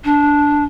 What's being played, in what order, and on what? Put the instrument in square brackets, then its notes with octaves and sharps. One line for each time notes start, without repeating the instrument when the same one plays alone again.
[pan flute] D4